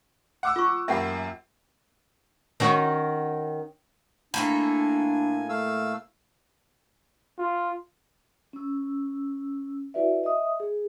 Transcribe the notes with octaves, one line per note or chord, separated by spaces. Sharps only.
F#5 D6 E6
F4 C#6
F#2 A#3 G4 E5 F#5 B5
D#3 C#4 F#4
A2 A#3 D4 A4 G#5
A3 F5 E6
F4
C#4 E6
E4 F#4 B4 D5 E5
D#5 E5 D#6
G#4